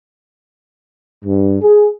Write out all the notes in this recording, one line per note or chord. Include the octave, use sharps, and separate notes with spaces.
G2
G#4